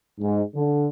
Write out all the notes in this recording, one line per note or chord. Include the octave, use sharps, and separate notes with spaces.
G#2
D3